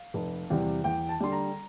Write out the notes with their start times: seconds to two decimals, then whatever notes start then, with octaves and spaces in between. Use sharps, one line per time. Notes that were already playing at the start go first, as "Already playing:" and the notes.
Already playing: F5
0.14 F1
0.50 E2 C3 G3
0.84 E2 G5
1.09 A5
1.20 D3 G3 C6
1.32 A#5